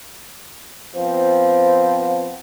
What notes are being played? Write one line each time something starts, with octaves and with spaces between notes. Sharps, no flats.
F3 B3 C4